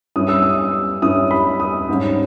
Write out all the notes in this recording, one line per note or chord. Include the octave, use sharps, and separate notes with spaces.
G2 G3 C#4 E4 D#6
E6
D#6
G2 G3 C#4 E4 D#6
B5
D#6
G#2 G3 C#4